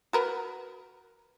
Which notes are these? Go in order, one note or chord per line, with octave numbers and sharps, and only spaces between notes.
F#4 A#4 B4